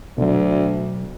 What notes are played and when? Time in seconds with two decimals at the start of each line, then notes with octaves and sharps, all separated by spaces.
0.18 D2 B2 F#3